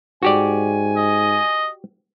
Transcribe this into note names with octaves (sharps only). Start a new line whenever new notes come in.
G#2 F#4 G4 D5 G#5
D#5